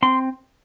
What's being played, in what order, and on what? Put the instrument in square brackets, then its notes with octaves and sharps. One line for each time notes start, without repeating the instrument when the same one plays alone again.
[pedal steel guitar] C4 C6